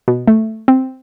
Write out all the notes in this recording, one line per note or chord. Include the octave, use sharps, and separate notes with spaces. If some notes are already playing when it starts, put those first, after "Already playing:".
B2
A3
C4